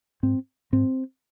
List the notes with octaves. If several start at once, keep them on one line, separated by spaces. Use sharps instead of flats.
G#2 C4
G#2 C4